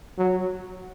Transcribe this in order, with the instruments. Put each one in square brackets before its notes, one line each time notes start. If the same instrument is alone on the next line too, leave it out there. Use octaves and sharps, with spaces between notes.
[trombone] F#3